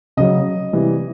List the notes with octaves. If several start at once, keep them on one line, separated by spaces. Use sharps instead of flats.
C#3 F#3 D#5
C3 E3 G3